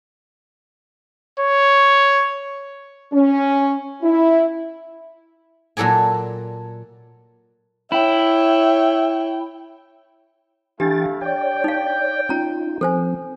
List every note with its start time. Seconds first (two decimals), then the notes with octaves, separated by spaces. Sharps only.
1.40 C#5
3.12 C#4
4.03 E4
5.77 A#2 F#3 A4 D5 G#5
7.92 E4 C#5 E5 G5
10.80 E3 A3 D4 E4 G4 F5 G5 A6
11.21 C#5 D5 G5
11.64 D#4 F5
12.29 C#4 D#4 F4 A#5
12.81 F3 C4 A4 C5 G#5